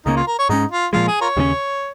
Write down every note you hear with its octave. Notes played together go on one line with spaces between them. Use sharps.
C#2 C#3 A#3 C#4 D#4
F4
A#4
C#5
G#2 G#3 C#4 D#4
F4
A#2 F3 G#3 F4
G#4
F4 A#4 C#5
D#2 C#3 G#3 C#4